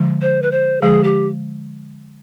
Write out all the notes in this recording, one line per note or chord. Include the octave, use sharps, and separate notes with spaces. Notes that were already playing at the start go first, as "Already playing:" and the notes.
Already playing: D3 F3 G#3
C5
B4
C5
D3 F3 G#3 G#4
G4